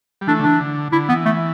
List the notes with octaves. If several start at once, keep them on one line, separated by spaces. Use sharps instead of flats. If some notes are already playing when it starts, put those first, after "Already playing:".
G3
E3 A3 D4
D3
E3 D4
D3
D3 E4
E3 B3
A3